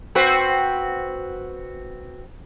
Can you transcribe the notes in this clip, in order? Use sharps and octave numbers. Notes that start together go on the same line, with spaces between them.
C4 F#4 B4